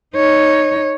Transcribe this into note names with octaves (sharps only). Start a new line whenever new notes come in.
D#4 C#5